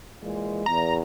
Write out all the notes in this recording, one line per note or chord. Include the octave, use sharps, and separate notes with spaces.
A#2 E3 G#3
E2 A#5